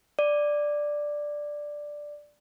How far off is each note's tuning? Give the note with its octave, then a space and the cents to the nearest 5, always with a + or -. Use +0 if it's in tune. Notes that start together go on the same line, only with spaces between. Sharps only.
D5 +5